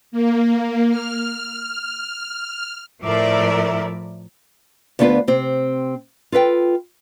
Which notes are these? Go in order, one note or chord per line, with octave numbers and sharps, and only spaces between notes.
A#3
F6
A2 F3 A#4 D5 E5
D2 B3 D4 F4 A#4 B4
C3 C4
F4 A4 B4 G5